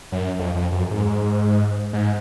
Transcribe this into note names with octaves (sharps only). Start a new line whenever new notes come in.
F#2
F2
F2
F#2
G#2
G#2